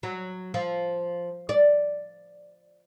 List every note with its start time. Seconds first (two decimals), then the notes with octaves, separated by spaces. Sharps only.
0.03 F#3
0.54 F3
1.49 D5